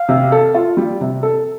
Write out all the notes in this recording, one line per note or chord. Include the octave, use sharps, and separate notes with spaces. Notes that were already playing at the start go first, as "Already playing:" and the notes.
Already playing: F5
C3
A4
F4
G3
C3
A4